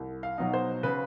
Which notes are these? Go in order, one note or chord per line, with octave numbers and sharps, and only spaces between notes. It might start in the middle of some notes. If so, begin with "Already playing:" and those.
Already playing: C2
F5
B2 F#3 B3 D#4
C5
C#3 B4